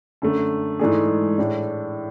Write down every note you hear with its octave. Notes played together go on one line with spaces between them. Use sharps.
F#2 D3 A3
G#2 E3 A3 D4 G#4
A2 G#3 D4